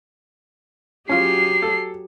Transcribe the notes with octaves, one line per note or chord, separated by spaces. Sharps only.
F#3 C#4 F4 G4 G#4 C7
A4